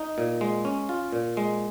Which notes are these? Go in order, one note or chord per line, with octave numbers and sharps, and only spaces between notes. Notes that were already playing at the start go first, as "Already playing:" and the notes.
Already playing: D#4
A#2
G#3
C#4
F4
A#2
G#3